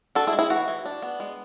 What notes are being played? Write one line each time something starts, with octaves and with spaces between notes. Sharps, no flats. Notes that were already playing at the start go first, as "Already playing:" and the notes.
D4 F#4 A4
E4 G#4
G#3
E4 G#4
E3 F#4
E3
D4
B3
G#3